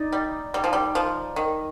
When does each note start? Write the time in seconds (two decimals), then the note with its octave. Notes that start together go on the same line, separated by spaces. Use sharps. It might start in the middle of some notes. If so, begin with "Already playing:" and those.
Already playing: D#4 D5
0.12 G3
0.54 G3
0.64 F3
0.73 G3
0.95 F3
1.36 D#3